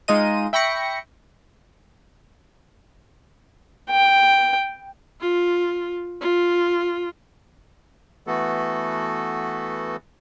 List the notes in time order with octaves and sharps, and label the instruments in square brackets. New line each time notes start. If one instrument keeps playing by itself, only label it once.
[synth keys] G#3 D#4 F4 D#5 D#7
E5 G5 B5 C#6 A#6 C#7
[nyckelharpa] G5
[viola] F4
F4
[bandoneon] E3 A3 B3 F#4 A4